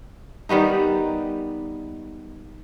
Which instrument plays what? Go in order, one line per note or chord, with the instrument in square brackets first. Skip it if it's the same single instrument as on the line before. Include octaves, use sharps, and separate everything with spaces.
[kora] D#3 G3 B3 D#4